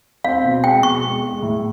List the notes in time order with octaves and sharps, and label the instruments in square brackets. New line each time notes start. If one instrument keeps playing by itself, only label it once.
[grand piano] C4 [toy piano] F5
[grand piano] B2
[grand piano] G#3 [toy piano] G5
[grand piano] B2 [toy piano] C#6
[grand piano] G#3
G#3
A2